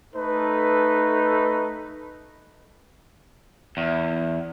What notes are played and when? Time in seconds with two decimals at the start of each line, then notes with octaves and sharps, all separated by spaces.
0.15 A3 D#4 A4 B4
3.77 E2